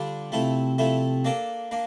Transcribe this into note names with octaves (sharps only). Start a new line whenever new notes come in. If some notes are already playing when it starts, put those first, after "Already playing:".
Already playing: D3 G3 D4 F4
C3 F3 A3 C4 E4 A4
F3 A3 E4 A4
A#3 D4 A4 D5
A#3 D4